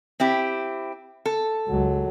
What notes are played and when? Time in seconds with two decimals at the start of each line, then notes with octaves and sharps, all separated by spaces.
0.20 C4 E4 G4
1.26 A4
1.69 C#2 F#3